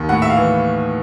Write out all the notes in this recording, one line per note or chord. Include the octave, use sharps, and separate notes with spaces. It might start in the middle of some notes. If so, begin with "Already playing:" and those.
Already playing: D#2
A2 F#5
E5
F5
E3